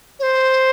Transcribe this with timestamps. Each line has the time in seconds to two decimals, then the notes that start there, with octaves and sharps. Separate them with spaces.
0.19 C#5
0.23 C5